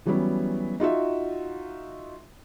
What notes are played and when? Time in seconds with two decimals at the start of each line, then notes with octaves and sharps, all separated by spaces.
0.06 E3 F#3 G3 B3 C#4 E4
0.80 D#4 F4 F#4 E5